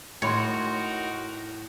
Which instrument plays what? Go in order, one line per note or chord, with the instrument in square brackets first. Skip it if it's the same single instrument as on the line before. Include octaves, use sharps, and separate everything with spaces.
[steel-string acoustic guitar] A2 [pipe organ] D#4 F#4 A#4 [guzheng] C#5 [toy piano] G5 B5 C6